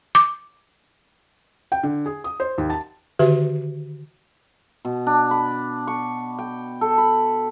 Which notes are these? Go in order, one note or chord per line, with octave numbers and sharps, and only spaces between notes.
D6
G5
D3
G#4
D#6
C5
D#2
A5
D3 D#3 F#4 G4 B4 E5
B2
D4
B5
C#6
G5
A4
B5